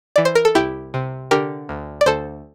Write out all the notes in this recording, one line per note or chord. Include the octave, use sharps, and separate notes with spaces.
E3 D5
C5
A#4
A4
C2 E4 G4
C3
D3 G4 A#4
D2
D5
D2 A4 C5